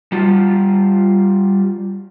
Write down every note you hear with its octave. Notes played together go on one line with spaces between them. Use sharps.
G3 F4